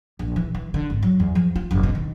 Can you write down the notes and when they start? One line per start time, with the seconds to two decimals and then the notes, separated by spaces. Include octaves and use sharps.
0.19 A#1
0.36 E3
0.55 E3
0.74 D3
0.90 G#1
1.03 F#3
1.20 E2
1.35 F3
1.56 F4
1.71 F#1
1.83 B2
1.95 D#3